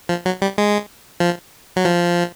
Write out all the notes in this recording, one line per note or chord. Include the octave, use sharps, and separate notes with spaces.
F3
F#3
G3
G#3
F3
F#3
F3